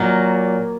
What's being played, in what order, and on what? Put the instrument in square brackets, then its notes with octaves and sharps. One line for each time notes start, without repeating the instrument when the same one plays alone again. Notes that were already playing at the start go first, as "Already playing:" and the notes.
Already playing: [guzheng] A#2 F#3 A#3 D#5